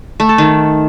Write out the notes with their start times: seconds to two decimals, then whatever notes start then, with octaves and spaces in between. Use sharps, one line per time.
0.20 A3
0.29 A4
0.38 D#3